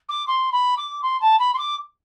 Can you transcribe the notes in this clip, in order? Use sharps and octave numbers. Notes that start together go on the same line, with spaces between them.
D6
C6
B5
D6
C6
A5
B5
C6
D6